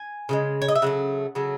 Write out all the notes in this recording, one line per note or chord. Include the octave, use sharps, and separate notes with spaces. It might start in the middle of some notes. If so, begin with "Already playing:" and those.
Already playing: G#5
C#3 E3 G#3
C#5
D#5
E5
C#3 F#3 A3 F#5
C#3 F#3 A3